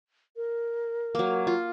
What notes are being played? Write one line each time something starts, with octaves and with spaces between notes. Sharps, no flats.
A#4
F#3 A#3
F4